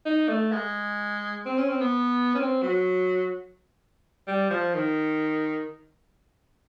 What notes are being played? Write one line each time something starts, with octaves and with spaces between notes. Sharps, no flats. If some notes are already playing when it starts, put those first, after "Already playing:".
D#4
A3
G#3
C4
C#4
C4
B3
C#4
C4
F#3
G3
F3
D#3